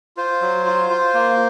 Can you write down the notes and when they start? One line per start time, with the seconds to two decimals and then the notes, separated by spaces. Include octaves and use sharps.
0.17 F4 C5
0.41 F#3
0.66 F4
0.90 F4
1.14 A#3